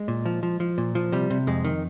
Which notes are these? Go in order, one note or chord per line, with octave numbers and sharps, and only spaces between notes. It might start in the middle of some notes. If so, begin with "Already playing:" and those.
Already playing: G#3
A#2
F3
F3
F3
A#2
F3
C3 G3
C3
F2 G#3
D#3